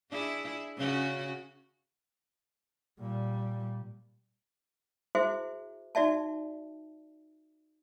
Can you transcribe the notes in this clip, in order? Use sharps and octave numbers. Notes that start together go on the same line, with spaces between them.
D4 E4 G#4
C#3 C#4 F#4
A#2 G3
E4 F#4 G#4 C5 E5
D#4 F#4 D5 E5 A5